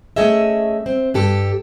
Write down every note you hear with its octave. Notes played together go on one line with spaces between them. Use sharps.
A3 C#4 G#4 D#5 E5
C4
G2 G4 A4